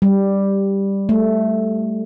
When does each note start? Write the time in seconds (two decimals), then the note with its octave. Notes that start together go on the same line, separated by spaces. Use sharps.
0.02 G3
1.09 A3